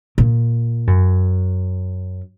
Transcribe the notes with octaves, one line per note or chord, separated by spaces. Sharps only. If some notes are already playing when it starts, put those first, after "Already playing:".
A#2
F#2